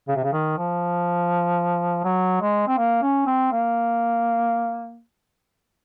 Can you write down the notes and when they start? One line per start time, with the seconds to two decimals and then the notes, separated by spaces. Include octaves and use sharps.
0.08 C#3
0.16 C3
0.24 C#3
0.32 D#3
0.58 F3
2.04 F#3
2.41 G#3
2.68 C4
2.78 A#3
3.02 C#4
3.26 C4
3.51 A#3